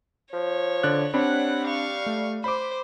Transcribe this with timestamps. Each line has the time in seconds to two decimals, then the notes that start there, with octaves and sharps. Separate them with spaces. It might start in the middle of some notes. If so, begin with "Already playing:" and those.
0.33 F3 C#5
0.83 D3 D5 F#6
1.14 G3 C4 D4 C#5 F#5 B5
1.66 F5 C#6
2.06 A3
2.44 C5 B5 D6